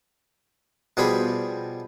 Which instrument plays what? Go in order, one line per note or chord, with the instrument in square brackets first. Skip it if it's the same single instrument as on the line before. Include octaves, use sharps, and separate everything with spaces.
[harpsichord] B2 F3 G3 G#4 B5